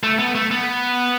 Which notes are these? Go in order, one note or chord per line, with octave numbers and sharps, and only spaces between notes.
A3
B3
A3
B3